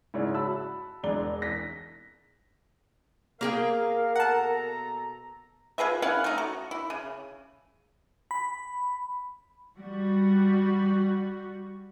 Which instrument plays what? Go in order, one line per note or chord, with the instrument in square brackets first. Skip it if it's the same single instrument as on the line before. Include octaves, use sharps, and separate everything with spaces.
[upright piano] G#2 C#3 E4 C#5 D5
F#4 A5 B5 E6
E1 G#3 D4 D5 A#5 G7
A#6 B6
[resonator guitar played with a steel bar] A#3 G#4 G5 [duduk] A#4 [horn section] F5
[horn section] B2 A4 A#5 [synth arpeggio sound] F#5 A5
[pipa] F4 G#4 B4 E5
C#4 E4 F5 F#5
A3 D#4
F#4
E4
C#3
[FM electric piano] B5
[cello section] G3 F#4